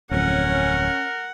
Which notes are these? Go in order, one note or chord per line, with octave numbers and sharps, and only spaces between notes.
D1 F2 C#4 A#4 F#5